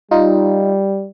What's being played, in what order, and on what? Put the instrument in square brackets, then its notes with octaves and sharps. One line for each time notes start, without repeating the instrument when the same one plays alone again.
[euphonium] G3 [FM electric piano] D#4 F4